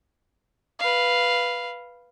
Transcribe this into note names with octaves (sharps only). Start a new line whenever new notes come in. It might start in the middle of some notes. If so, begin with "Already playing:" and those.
B4 F5